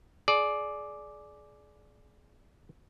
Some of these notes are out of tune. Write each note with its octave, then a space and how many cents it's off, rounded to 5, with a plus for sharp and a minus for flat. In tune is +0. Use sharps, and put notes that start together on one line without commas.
G#4 +30 D5 +0